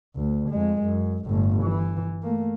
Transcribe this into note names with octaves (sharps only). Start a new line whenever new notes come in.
D2
F2 G#3
F#2
G1 A2
E3
A3 A#3